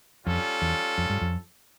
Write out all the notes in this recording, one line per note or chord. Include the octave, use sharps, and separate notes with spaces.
F2 G3 C#4 F4 A4
E2
F2
G2
F2